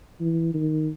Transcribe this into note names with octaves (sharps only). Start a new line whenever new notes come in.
E3
D#3